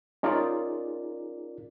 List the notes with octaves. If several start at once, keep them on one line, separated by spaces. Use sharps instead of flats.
C#4 D#4 F4 G#4 A#4 D5